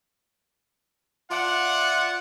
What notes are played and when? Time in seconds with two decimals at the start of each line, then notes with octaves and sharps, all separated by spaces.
1.31 F4 D5 E5 F#5